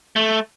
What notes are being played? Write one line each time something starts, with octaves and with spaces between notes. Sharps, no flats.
A3